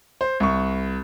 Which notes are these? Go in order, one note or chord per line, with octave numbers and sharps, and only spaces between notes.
C5
C2 C#6